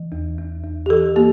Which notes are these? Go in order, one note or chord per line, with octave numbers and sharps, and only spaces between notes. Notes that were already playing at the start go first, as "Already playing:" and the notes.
Already playing: E3
E2
E2
E2
G4
E3 A4
A#3 G4